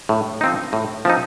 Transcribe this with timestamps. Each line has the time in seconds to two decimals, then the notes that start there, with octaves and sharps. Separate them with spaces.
0.09 A2
0.41 F3 C4 D#4
0.73 A2
1.05 F3 C4 D#4